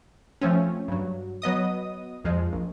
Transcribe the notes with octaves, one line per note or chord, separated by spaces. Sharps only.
F3 A3 C4 C#4
G2 F#3
F#3 B3 D#5 D#6
F2 F3 G#3
A#1